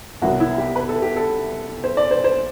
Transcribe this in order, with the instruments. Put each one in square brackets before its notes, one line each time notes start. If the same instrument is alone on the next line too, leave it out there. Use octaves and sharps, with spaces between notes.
[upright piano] C2 B2 F#3 B3 F#4
E4
G4
B4
A4
G4
A4
C5
D5
C5
C5